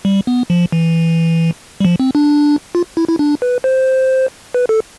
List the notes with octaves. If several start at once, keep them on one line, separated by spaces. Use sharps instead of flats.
G3
B3
F3
E3
G3
F3
C4
D4
F4
E4
E4
D4
B4
C5
B4
A4